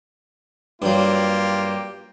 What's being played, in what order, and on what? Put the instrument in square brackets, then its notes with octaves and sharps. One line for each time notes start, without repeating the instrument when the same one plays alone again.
[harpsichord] G2 F#3 [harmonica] A#3 F4 G4